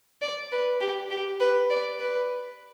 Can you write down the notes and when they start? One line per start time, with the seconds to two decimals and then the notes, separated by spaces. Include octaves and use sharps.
0.22 D5
0.51 B4
0.81 G4
1.11 G4
1.40 B4
1.70 D5
1.99 B4